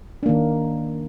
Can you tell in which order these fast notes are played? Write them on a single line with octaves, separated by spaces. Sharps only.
D4 A#3 D#3